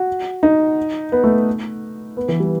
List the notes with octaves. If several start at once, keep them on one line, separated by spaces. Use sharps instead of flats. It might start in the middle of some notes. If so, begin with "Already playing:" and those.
Already playing: F#4
D#4
B3
A3
B3
E3
G3